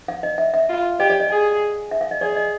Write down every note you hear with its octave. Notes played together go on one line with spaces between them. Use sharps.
F5
D#5
E5
E5
F4
G4 D#5
D5
D#5
G#4
E5
F5
D#5
G#4 D5
D#5